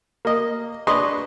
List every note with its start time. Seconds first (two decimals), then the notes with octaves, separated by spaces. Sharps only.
0.25 A#3 D#5
0.87 D4 G#4 B4 D#5 C6 C#6